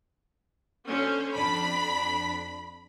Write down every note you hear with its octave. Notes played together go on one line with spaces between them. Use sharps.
D3 C#4 C5
F2 D4 B5 B6